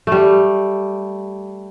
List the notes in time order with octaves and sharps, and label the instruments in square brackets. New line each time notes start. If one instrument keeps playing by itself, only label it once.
[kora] G3 A3